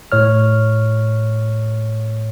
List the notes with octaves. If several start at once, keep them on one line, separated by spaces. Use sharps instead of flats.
A2 C#5 F6